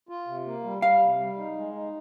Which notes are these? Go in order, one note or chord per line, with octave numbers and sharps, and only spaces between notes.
F4
C3
A#3
G3
G3 F5
C3
G3
D#4
G#3
D#4